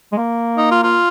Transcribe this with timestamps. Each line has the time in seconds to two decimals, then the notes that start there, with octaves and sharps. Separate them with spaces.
0.12 G#3
0.17 A#3
0.57 D#4
0.71 F4
0.83 F4